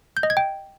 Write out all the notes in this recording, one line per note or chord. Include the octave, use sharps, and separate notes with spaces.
G6
D#5
G#6
G5